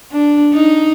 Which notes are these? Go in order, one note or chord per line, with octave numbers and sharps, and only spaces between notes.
D4
D#4